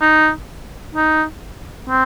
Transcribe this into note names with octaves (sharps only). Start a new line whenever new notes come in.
D#4
D#4
C4